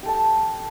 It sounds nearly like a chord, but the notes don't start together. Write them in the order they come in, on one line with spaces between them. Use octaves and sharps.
G4 A4 A5